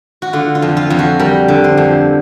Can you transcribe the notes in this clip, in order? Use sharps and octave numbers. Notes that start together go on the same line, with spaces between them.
F#4
D3 F4
F4
F2
F4
F2
F#4
G3 A#4
D3
C5
F2